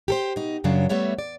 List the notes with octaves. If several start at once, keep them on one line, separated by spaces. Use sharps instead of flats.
G4 A4 C5
B2 D#4
F#2 C#3 F#3 D4
G3 A3 B3 C#5 E5
D5